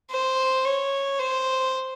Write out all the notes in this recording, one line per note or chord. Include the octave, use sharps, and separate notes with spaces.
C5
C#5
C5